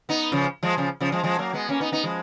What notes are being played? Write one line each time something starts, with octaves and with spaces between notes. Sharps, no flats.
B3 D#4
C#3 F3
F3 G#3
C#3 F3
C#3 F3
F3 G#3
F3 G#3
F#3 A#3
G#3 B3
A#3 C#4
B3 D#4
B3 D#4
F3 G#3